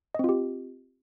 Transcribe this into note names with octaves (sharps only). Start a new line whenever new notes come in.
C4 F4 G4 D#5